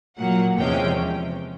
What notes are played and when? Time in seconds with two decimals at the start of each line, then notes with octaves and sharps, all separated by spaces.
0.17 A#2 F#3 A#3 F#5
0.56 E2 C3 F3 G#3 C#4 G5